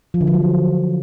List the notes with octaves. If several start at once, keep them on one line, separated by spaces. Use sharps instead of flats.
F3
D3
F3
F#3